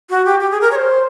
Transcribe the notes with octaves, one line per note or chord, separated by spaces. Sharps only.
F#4
G4
G4
G#4
A#4
C#5
C5